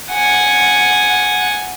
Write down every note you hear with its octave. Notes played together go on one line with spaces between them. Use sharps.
F#5 G#5